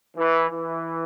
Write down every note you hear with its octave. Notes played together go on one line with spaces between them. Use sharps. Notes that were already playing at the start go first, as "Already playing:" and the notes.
E3
E3